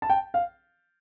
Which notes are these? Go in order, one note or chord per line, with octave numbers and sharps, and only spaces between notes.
A5
G5
F5